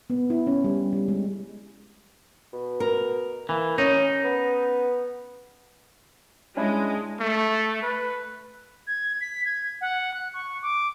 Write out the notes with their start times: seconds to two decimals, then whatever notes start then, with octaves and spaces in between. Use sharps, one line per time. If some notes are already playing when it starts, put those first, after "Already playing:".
0.10 B3
0.30 E4
0.47 C#4
0.64 G3
0.93 G3
1.08 G#3
2.53 B2
2.80 A#4
3.49 E3 A#3
3.78 C#4 D#4
4.24 B3
6.57 G#3 C#4 D4 E4
7.20 A3
7.82 B4
8.87 G#6
9.21 B6
9.45 G#6
9.81 F#5
10.14 F#6
10.34 C#6
10.62 D6